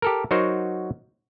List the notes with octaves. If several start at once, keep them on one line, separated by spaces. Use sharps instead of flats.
G4 A4 A#4
F#3 D#4 F#4 A#4 C5